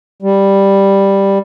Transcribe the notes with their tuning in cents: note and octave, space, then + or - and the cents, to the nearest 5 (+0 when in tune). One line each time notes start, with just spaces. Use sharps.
G3 +5